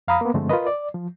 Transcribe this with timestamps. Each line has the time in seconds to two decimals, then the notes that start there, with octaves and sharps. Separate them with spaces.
0.08 F2 F5 A#5 B5 D#6
0.21 A#3 B3
0.34 G2 D3 F3 G#3 A3 C4
0.49 F4 A#4 B4 D#5
0.67 D5
0.95 F3